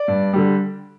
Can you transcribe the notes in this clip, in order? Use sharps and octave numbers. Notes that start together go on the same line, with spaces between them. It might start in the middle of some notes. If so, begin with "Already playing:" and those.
Already playing: D5
G2
D3 G3